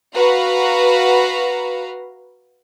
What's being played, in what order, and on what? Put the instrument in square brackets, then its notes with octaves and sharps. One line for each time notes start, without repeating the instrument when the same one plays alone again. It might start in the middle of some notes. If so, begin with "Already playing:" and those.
[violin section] F#4 B4 F5 A#5